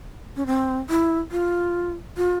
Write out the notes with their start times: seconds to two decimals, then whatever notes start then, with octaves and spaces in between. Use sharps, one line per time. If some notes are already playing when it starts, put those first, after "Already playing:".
0.36 C#4
0.46 C4
0.90 E4
1.31 F4
2.17 F4